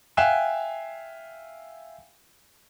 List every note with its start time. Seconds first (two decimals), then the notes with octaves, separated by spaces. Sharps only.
0.17 E5 F5 G5 G#5 F#6 E7